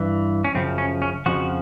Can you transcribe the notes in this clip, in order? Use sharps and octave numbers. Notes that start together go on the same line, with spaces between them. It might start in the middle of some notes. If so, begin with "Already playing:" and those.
Already playing: G2 E3
C#4
F#2 C#3 F3 C4
C#4
C#4
F2 C#3 F3 F#4